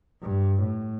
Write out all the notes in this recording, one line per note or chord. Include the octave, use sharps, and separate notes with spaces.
G2
A2